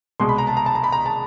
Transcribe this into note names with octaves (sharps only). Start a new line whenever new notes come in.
C2 B2 G#3 C6
B5
A#5
A5
A#5
A5
A#5
B5
A#5
A5